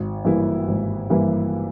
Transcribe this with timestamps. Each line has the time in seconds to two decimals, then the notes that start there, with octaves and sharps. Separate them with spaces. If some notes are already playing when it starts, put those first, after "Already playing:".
Already playing: G#1
0.25 G2 E3 A#3 E4
0.67 G#1
1.10 G2 E3 A#3 E4